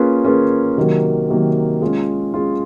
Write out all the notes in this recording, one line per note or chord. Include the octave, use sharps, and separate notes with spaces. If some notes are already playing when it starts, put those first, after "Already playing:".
Already playing: A#3 C#4 F4 G#4 B4
A#3 C#4 F4 G#4 B4
C3 D#3 F#3 A#3
C3 D#3 F#3 A#3
G#3 C#4 F4 G#4
G#3 C#4 F4 G#4